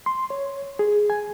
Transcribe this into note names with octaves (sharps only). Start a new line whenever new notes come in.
C6
C#5
G#4
G#5